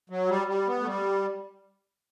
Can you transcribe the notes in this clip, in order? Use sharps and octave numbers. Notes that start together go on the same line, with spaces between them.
F#3
G3
G3
B3
A3
G3